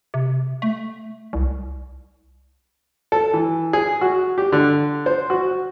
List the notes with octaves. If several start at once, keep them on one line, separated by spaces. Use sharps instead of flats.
C3
A3
C2
A4
E3
G#4
F#4
G4
D3
C5
F#4